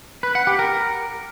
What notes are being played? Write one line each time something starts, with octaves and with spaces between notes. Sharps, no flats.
B4
F#5
G4
A#4